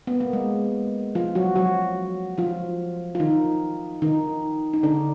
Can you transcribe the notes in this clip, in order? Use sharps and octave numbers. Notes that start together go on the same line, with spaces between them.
B3
A#3
G#3
F3 F4
F#3 F#4
F#3 F#4
F3 F4
F4
D#3 D#4
D#3 D#4
D#4
D3 D4